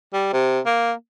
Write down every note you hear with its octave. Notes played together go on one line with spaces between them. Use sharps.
G3
C3
A#3